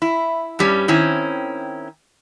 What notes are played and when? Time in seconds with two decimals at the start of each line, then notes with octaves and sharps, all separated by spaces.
0.02 E4
0.59 G2 G3 C#4
0.88 D#3 C4 C#4 E4